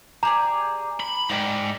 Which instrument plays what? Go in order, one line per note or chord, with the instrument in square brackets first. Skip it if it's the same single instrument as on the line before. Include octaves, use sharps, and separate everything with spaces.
[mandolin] G4 G#4 D5 [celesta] A#5
[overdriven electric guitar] B5
[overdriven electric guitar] G#2 [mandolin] A#4 D5 G5